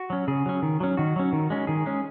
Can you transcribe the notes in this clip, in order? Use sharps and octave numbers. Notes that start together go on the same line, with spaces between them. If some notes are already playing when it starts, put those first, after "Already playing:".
Already playing: F#4
F#3 C#4
C#3 G#4
F#3 C#4
D#3
F#3 C#4
D#3 F#4
F#3 C#4
D#3
G#3 C#4
D#3 G#4
G#3 C#4